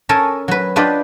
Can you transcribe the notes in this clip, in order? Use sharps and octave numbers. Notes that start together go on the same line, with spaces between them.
C#4 A4 A#4 G#5 A5
F#3 B4
D4 F4 G4 B4 D5 D#5